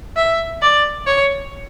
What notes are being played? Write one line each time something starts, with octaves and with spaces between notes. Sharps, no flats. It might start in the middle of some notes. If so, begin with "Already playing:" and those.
E5
D5
C#5